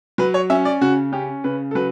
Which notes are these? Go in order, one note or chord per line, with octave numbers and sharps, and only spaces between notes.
F#3 B4
C#5
C#4 E5
D5
C#3 F#4
C#4 G4
C#3 B4
A4
F#3 B4